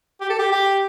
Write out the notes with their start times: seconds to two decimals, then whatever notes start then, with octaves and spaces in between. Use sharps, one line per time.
0.21 G4
0.30 A4
0.39 G4
0.52 G4